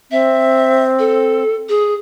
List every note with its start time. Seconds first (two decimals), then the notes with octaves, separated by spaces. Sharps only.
0.11 C4 E5
0.99 A4
1.69 G#4